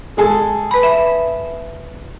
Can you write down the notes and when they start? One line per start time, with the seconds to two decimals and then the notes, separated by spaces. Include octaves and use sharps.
0.17 G#3 G#4 A4
0.71 B4 B5
0.83 E5